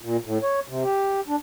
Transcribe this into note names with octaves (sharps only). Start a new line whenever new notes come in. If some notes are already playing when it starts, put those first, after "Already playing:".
A#2
A2
C#5
C3
G4
D4